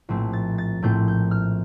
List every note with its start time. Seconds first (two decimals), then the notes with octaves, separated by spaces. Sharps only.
0.09 A#1 A2 A3 C4
0.33 A6
0.58 A6
0.82 A#1 A2 A3 C4 G6
1.08 G6
1.31 F6